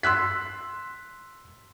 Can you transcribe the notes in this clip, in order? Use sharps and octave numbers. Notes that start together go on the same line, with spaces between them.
C6 E6 F#6 B6